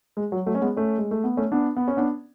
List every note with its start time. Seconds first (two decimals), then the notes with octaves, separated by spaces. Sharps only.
0.17 G#3
0.32 F#3
0.46 F#3 A3
0.55 C#4
0.61 G#3 B3
0.77 A3 C#4
0.98 G#3
1.11 A3
1.24 B3
1.37 A3 C#4
1.52 B3 D4
1.77 B3
1.88 C#4
1.97 B3 D4